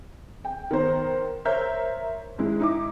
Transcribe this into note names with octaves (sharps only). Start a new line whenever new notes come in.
G5
D#3 B3 A#4 C5
A#4 C5 C#5 E5 F6 G6
G#2 G#3 E4
D#4 E4 D6